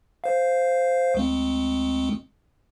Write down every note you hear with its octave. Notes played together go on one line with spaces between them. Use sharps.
C5 F5
D2 G#3 C4